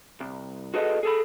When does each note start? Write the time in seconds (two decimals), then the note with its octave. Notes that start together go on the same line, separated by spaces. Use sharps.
0.20 C2
0.74 F#4 G#4 A4 B4 D#5
1.03 G#4 A4 B5